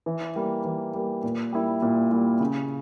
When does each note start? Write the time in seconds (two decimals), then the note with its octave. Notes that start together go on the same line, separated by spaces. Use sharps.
0.06 E3
0.36 G3 A#3
0.65 E3
0.94 G3 A#3
1.23 A#2
1.52 G3 A#3 E4
1.82 A#2
2.11 G3 A#3 E4
2.40 C#3